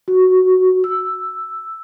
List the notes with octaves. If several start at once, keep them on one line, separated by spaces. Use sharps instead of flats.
F#4
E6